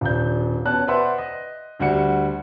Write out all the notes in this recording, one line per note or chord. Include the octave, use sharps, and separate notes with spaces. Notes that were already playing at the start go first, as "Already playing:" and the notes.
D#1 D4 G6
B2 C#4 A5 F#6
B4 C5 D5 E5 F#5 C6
D#5
D2 G3 F#4 C#7